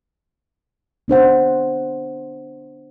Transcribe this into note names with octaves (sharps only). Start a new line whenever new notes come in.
B3 D4 C5 F#5